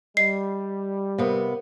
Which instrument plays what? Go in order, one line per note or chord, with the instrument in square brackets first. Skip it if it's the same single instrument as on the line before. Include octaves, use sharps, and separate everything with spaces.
[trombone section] G3 [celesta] D#5 [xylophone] C7
[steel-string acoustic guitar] C3 B3 [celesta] A#4 F5